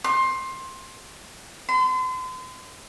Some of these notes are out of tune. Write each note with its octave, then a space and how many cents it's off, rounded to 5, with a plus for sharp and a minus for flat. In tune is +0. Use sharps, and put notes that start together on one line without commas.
C6 +20
C6 -40